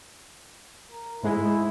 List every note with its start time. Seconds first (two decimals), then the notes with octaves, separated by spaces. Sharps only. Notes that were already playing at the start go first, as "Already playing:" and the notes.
0.91 A#4
1.23 G#2 G#3 E4